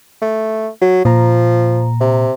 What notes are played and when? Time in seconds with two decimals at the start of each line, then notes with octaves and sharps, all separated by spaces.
0.22 A3
0.82 F#3
1.05 A#2 F3 A#5
2.01 C3